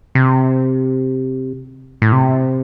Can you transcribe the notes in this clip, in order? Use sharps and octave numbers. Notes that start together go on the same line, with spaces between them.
C3
A2
C3